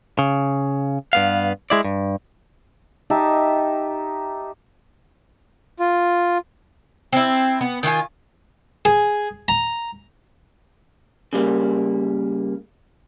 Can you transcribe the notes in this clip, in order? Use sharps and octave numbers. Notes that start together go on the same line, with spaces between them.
C#3
G2 B3 F5
G#3 E4 D5
G2
D#4 G4 E5 A5
F4
C4 E4
B3
D#3 F4 F#4 G#5
G#4
A#5
C#3 G3 A#3